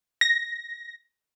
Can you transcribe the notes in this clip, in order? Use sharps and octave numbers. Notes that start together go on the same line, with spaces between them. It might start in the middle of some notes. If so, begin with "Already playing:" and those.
A#6